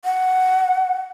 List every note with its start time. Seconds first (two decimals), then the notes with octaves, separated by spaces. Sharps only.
0.05 F#5